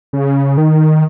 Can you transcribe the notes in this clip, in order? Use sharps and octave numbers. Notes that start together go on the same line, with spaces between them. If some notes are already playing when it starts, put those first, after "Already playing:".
C#3
D#3